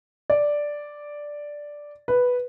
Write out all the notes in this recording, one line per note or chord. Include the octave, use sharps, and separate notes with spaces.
D5
B4